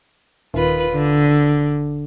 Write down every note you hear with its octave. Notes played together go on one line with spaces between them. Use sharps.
D#1 D#3 F4 B4
D3